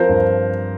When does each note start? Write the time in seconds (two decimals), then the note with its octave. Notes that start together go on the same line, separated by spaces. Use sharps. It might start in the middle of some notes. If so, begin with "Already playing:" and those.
Already playing: F3 C4 A#4 C5
0.09 G2